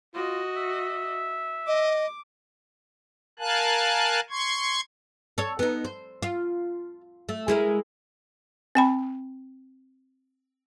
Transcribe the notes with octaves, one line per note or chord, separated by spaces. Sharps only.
F4 F#4 D#5
E5
D#5 D6
A#4 F5 G#5 A5 F#6
C6 C#6 G#6
A4 C#5
B3 D#4
C5
F4
A3
G#3 E4 A#4
C4 G5 B5